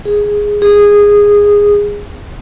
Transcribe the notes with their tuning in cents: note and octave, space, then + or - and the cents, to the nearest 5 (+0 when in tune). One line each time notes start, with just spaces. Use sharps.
G#4 -5
G#4 -15